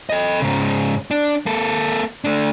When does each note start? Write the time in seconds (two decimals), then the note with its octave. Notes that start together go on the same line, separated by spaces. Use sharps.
0.10 A4 D#5
0.42 G#2 C#3
1.11 D4
1.46 A#3 A4
2.24 A3 D4